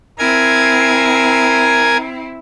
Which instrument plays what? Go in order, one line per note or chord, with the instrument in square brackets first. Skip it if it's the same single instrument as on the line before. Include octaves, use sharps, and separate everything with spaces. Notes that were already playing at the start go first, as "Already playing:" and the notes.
[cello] C4 E4 [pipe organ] A#4 G#5 G#6